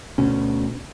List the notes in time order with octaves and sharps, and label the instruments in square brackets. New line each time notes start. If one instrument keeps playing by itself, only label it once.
[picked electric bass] D2 B2 C#4